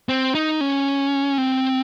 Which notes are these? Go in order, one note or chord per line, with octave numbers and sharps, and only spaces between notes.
C4
D#4
C#4
C4